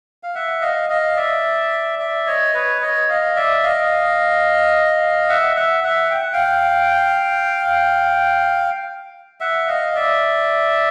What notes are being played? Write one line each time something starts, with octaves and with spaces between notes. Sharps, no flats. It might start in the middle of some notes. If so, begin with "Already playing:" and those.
F5
E5 F#5
D#5 F5
D#5 F5
D5 E5
D5 E5
C#5 D#5
B4 C#5
C#5 D#5
D#5 F5
D5 E5
D#5 F5
E5 F#5
E5 F#5
E5 F#5
G5
F#5
F5 G5
E5 F#5
D#5 F5
D5 E5